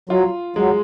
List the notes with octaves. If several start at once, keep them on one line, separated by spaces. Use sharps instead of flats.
F#3 F4
F#3 G#3